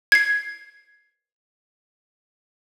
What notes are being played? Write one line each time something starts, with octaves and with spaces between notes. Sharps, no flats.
G#6 C7